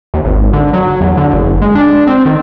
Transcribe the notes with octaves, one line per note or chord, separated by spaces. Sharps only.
D#2
G#1
D3
F#3
E2
D3
F#1
G#3
D4
C4
D#3